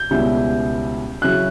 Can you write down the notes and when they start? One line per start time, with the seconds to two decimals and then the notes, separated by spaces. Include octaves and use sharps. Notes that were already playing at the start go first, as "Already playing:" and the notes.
Already playing: G6
0.11 C#2 B2 G3 C#4 E4
1.22 C#3 F#3 C#4 E4 F#6